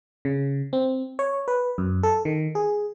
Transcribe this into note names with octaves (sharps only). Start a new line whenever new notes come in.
C#3
C4
C#5
B4
F#2
A4
D#3
G#4